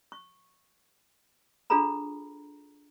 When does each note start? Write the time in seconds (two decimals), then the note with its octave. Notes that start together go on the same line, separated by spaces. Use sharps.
0.12 C#6
1.70 D4 F4 G#4 A4 A#5 B5